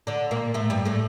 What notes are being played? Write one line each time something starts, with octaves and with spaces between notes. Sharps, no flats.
D3 D4
A#2 A#3
A2 A3
G2 G3
A2 A3